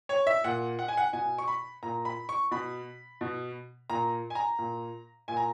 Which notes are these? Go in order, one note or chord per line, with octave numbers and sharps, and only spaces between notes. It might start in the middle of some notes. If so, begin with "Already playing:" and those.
C#5
E5
A#2 F#5
F#5
G#5
F#5
B2 G#5
C#6
B5
A#2 A#5
B5
C#6
B2 B5
B2
A#2 A#5
G#5
A#5
A#2
A#2 G#5
A#5